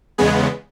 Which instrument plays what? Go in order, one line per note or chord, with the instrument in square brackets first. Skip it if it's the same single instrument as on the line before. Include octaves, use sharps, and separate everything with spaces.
[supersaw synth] E2 C#3 G#3 B3 G#4